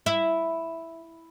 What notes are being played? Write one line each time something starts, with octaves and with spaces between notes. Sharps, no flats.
E4